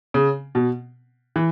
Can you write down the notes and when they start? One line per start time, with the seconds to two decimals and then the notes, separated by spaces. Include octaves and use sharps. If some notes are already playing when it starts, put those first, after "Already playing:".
0.14 C#3
0.55 B2
1.36 E3